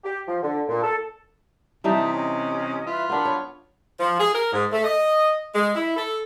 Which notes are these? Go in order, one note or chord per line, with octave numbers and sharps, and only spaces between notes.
G4
F3
D3
A#2
A4
C3 E3 G3 D#4 E5 A5 D#6
C#4 D#5
F4 B4 E5
B3 D4 A#4 F#5 B5
C#5
F3
G#4
A#4
G#2
A3
D#5
G#3
E4
A4